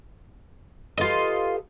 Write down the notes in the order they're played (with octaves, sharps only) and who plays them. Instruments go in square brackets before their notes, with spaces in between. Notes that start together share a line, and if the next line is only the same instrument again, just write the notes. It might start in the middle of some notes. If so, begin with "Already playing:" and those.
[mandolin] F4 D#5 [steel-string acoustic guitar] G4 A4 B4